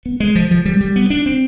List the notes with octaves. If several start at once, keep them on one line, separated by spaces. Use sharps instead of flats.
B3
G#3
F3
F3
G3
G3
B3
D4
C4